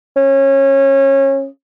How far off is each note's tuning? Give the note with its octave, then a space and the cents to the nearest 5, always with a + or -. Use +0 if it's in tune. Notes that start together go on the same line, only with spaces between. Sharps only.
C#4 -25